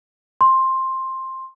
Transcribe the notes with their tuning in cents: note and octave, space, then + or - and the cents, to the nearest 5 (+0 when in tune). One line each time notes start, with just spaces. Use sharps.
C6 +10